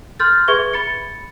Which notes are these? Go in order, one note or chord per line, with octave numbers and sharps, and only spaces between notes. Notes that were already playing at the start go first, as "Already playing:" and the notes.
C6 F6 G6 A6
G#4 B4 E5 C#6 G#6 G7
B5 A6 C#7